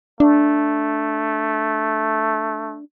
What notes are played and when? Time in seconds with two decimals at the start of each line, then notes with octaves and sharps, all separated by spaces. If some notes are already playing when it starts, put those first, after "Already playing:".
0.20 A3 D4